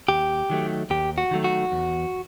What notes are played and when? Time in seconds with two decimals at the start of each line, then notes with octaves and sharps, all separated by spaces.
0.09 D#2 G4
0.50 D#3 F#3 A3
0.90 D#2 G4
1.18 F#4
1.31 D#3 F#3 A3
1.44 F#4
1.72 E2